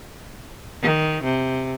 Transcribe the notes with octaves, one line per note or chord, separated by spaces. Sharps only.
D#3
C3